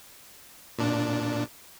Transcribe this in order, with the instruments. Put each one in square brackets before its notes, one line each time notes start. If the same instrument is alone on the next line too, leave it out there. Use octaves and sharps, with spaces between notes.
[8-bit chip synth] A#2 D4